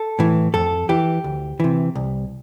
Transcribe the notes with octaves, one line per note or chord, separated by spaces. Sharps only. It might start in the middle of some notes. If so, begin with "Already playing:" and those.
Already playing: A4
A2 E3
F2 A4
E3 G4
D2
C3 E3
C2